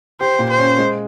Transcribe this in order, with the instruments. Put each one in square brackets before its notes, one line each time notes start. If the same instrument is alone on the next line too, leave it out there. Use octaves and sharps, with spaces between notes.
[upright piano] G4 [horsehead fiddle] C5
[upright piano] A#2
[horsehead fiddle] C5
[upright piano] C#4
G#3